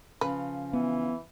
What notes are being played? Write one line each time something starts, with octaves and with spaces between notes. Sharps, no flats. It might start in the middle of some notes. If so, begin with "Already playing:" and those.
C#3 F3 B4
E3 B3